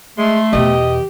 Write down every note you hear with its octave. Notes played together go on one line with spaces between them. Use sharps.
G#3 A3 C6
E2 B2 G4 D#5